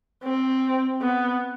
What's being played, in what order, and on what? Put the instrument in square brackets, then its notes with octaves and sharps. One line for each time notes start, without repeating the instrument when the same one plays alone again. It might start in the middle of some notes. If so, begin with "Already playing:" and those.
[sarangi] C4
B3